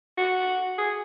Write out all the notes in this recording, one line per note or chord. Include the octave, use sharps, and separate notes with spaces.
F#4
G#4